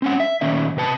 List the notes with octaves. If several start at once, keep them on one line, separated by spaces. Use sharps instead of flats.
C4 C#4 F#5
E5
A#2 D#3 C#4 E5
C3 B4 A5